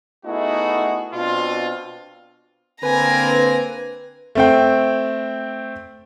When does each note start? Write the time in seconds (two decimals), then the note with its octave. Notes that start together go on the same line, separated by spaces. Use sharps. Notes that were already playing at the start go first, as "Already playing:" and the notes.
0.25 A3 B3 D#4 E4 F#4 G#4
1.14 B2 C4 D4 F4
2.83 D3 A#3 C4 B4 G#5 A#5
4.35 A3 C4 G5